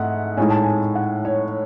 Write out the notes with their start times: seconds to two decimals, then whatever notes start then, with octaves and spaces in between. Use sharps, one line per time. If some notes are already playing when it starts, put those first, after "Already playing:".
Already playing: G#2 A3 D#5 E5 F#5
0.37 A2 G#3 D#4 G#5
0.50 A5
0.63 G#5
0.95 F#5
1.25 C#5